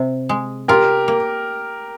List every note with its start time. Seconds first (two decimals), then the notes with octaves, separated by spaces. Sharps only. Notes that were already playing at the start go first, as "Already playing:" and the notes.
Already playing: C3
0.29 G#3
0.68 F4 G4 A#4
1.08 A#3